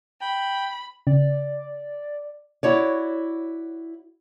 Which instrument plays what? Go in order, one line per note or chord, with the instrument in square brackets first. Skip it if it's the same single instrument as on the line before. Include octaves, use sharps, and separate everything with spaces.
[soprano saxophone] G5 [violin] B5
[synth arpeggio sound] C#3 [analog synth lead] D5
[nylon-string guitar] E4 F#4 C#5 D5